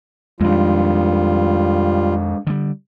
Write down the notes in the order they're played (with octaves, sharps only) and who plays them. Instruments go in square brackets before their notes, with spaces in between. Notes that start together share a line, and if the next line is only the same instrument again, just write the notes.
[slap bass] F2 D#3 [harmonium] G3 F4 [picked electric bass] G#3 D4
[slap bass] D3 G3